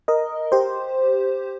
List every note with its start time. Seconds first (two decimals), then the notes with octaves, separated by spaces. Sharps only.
0.08 A#4 D#5
0.52 G4 C5